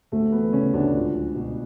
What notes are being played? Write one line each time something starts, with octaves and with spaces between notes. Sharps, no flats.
D2 A3
E3 B3
C#3 C#4
D2 D4
C#2
F#3
B2